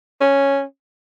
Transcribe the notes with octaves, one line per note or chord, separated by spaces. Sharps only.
C#4